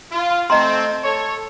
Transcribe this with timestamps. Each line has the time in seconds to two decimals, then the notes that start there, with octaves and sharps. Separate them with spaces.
0.12 F4
0.50 A3 C4 D#5 A#5 C6
1.03 A4 C#5